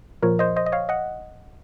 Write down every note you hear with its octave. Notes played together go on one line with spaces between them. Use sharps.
A#2 F3 A#4 C#5
C5 D#5
C5 D#5
D#5
C#5 F5
D#5 F#5